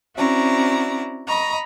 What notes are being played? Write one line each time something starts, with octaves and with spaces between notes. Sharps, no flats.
C4 C#4 E4 F#4 D5 A#5
D#5 A#5 B5 C#6